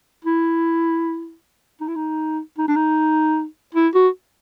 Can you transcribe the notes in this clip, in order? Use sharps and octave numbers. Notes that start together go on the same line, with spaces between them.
E4
D#4
E4
D#4
D#4
D4
D#4
E4
F#4